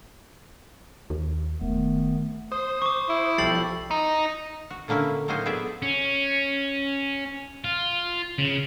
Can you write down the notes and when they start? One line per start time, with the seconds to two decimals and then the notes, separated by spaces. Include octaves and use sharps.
1.10 D#2
1.61 E1 D#3 A3 B3
2.52 C5 D#6
2.82 C#6 D6
3.09 E4
3.38 B1 F3 G3 A4 G5 A6 C7 F#7
3.91 D#4
4.70 F#4
4.88 A#2 D3 A#3 C#4 E4
5.28 A2 F#3 A#3 D#4 C5 G#5
5.46 B3 G#4 D5 E5
5.82 C#4
7.65 F4
8.39 C#3